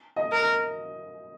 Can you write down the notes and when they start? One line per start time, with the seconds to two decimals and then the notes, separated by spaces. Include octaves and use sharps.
0.16 D#5
0.32 A#4